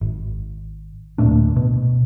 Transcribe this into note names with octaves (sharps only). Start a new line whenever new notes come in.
G#1
D1 A#2 A3 D4
B2